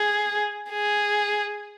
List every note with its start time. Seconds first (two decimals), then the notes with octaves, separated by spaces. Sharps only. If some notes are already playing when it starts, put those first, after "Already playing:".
Already playing: G#4
0.70 G#4